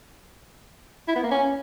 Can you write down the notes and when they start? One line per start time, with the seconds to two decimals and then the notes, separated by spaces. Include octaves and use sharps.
1.08 E4
1.16 B3
1.24 A#3
1.31 C#4